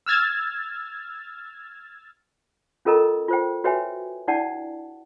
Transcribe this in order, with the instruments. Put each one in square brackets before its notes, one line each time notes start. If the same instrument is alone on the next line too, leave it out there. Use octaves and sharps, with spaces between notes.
[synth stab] E6 F6 G#6 A6
[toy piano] C#4 F4 A4 A#4 D#5 A#5
F4 C5 G5
F#4 B4 C#5 E5 G5 G#5
D4 E4 D5 F#5 G5 A5